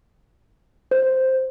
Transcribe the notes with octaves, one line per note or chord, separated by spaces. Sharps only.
C5